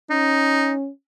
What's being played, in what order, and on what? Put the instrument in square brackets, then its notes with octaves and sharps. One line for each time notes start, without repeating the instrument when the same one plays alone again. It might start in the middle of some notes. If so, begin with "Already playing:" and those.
[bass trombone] C#4 [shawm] D#4